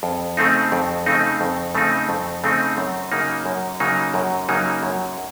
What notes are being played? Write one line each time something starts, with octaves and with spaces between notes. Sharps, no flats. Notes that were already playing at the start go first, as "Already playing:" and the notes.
F2
C#3 A3 C4 D#4
F2
C#3 A3 C4 D#4
F2
C#3 A3 C4 D#4
F2
C#3 A3 C4 D#4
F#2
C#3 F#3 A#3 D#4
F#2
C#3 F#3 A#3 D#4
F#2
C#3 F#3 A#3 D#4
F#2